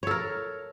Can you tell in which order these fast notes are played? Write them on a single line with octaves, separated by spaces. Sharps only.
C#5 A4 A#4